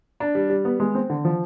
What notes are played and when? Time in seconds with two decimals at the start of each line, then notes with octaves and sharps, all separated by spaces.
0.20 D4
0.35 G3
0.50 G3
0.65 B3
0.80 G#3
0.95 C4
1.10 D3
1.25 F3